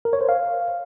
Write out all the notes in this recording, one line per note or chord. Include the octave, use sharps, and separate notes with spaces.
A#4
C#5
C5
F5